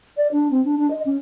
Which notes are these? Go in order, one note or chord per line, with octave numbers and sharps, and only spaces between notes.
D5
D4
C4
D4
D4
D#5
C#4